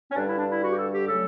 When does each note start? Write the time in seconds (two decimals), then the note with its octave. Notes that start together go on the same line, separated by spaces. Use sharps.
0.11 C#4
0.15 G2 D3 G3 D4
0.27 E4
0.38 D4
0.50 E4
0.62 F#4
0.72 G4
0.77 A4
0.92 G4
1.08 C#3 F#3 A3 A4